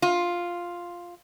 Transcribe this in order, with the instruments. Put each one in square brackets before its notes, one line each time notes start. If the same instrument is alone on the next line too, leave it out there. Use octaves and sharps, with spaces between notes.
[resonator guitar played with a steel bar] F4